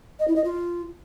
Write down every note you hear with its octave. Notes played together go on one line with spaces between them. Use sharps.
D#5
E4
D#5
F4